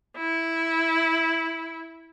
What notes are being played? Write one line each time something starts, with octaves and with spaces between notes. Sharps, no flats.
E4